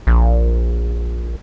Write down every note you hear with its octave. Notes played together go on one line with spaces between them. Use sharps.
A#1